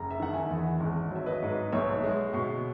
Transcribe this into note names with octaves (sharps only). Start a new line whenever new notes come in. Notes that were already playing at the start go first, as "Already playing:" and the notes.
Already playing: F#1 A#5
E5
D#3 F#5
E5 G#5
E2
G#1
F#3 E5
B4 D#5
G#2
B1 C#5 E5
G#3
B2